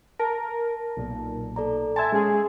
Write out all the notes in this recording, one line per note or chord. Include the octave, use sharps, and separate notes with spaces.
A#4 A5 A#6
B1 A#2
A4 D5 A#5
E5 G#5 A5 C6 G#6
G#3 C#4 G#4